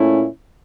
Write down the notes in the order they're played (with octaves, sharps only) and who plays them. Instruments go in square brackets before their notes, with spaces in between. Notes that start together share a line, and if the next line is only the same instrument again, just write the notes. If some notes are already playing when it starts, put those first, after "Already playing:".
Already playing: [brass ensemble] A#2 A3 C#4 E4